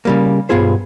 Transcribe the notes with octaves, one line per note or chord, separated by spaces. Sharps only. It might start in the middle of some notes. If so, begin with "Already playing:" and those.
C#3 G3 A#3
B1 G2 B3 F4 G#4 C5